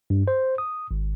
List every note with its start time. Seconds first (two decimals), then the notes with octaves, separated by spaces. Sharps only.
0.10 G2
0.28 C5
0.58 D#6
0.91 G#1